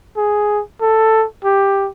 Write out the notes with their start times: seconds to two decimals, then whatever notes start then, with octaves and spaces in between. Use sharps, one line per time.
0.17 G#4
0.81 A4
1.44 G4